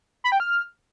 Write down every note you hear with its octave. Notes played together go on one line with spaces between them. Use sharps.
B5
G5
F6